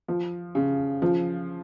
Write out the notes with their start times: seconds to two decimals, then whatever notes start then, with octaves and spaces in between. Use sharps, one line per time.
0.08 F3
0.55 C#3
1.02 F3